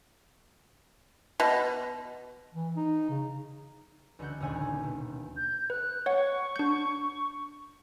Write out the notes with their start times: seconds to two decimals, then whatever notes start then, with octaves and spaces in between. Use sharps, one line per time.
1.40 B2
2.54 E3
2.76 D#4
3.09 C#3
4.19 C#2 D3 F#4 F#5 G6
4.40 D#1 A#1 D#2 D3 F#5 G#5
4.83 B2
5.37 G6
5.70 B4 F#6
6.06 C#5 F#5 C#6
6.56 D4 G6